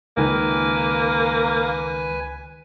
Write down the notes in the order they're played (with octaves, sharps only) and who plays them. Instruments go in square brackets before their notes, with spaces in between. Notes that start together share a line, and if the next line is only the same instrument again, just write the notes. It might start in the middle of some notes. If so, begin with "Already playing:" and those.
[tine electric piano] C#2 D#3 [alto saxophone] A#3 [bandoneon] B4 G#5